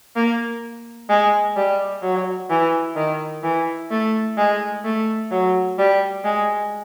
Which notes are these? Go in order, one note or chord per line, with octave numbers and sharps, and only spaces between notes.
A#3
G#3
G3
F#3
E3
D#3
E3
A3
G#3
A3
F#3
G3
G#3